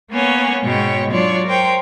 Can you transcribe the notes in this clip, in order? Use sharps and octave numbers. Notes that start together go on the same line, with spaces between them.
A#3 B3 C#4 C#5
G#2 B2 G#3 C#4 C#5 G5
F#3 D4 F4 C#5 D5
A#4 C5 C#5 G5